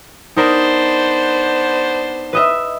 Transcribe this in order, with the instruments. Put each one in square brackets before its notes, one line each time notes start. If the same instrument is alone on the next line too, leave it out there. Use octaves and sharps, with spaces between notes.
[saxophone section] B3 D4 C5 [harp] D#4 A#4
[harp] B4 D#5 E5